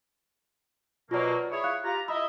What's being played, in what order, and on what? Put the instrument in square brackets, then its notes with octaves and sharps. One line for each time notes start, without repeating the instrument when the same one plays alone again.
[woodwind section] B2 F#3 A#3 [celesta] F4 D5
[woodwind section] E4 G#4 C#5
[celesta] F5 F#6
[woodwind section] F4 G4 A#5
[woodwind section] E4 D#5 E5 [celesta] B5